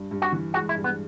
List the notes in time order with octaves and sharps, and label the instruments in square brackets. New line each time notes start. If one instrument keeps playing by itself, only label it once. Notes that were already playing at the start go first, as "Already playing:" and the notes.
Already playing: [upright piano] G2
G2
[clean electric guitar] F#4
[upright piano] E3
[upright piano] G#3 [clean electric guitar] F#4
[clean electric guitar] E4
[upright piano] G2
[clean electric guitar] B3